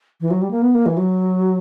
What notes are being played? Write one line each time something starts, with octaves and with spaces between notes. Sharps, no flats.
E3
F#3
G3
A#3
B3
A#3
E3
F#3